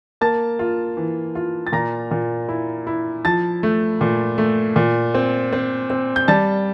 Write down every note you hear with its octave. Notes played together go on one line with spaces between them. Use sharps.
A#3 A5 A6
F4
E3
F4
A6
A#2 A#5 A#6
A#2
E4
E4
F3 A5 A6
A3
A#2
A3
A#2
C4
C4
C4
G6
G3 A5 A6